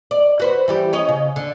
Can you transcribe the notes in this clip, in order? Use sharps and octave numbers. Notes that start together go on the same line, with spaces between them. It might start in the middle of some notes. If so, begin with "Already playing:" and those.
D5
F#4 B4 C5
E3 G3 G4
C#4 C#5 D#5
C#3
D3